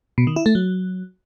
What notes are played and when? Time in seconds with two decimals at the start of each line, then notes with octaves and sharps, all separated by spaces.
0.18 B2
0.27 D#3
0.36 E4
0.46 A3
0.55 F#3